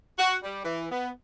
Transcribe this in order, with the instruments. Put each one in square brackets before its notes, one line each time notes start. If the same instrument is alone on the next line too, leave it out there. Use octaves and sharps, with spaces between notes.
[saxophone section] F#4
G3
E3
B3